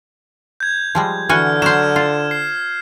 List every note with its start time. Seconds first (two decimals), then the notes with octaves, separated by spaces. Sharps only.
0.60 G6 G#6
0.95 F3 G3 G#3
1.29 D3 E3 F#4 G#5 F6
1.62 F#3 C5 F6 G#6 E7
1.96 F4
2.31 C7